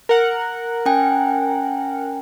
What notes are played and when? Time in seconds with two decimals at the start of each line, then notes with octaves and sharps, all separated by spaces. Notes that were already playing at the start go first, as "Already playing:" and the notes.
0.09 A#4 F#5
0.86 C#4 G5 G#5